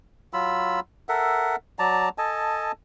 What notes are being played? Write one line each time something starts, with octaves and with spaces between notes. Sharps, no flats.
F#3 F4 B5 E6
A4 A#4 E5 F#5
F#3 D5 A5 A#5
A4 D#5 G#5 A5